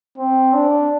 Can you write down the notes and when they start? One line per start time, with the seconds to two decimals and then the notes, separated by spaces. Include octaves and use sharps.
0.18 C4
0.53 D4